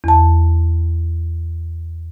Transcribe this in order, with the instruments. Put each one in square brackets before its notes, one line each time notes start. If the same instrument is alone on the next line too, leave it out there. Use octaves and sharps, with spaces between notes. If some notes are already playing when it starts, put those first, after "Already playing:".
[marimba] E2 A5